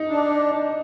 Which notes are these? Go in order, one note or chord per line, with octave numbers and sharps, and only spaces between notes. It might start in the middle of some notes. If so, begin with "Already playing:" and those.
Already playing: D#4
D4